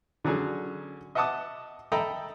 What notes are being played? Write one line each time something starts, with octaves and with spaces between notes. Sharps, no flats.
D3 F#3 C#4 G#4
D#5 E5 F#5 A5 D6 D#6
A4 D#5 E5 G5 A#5 B5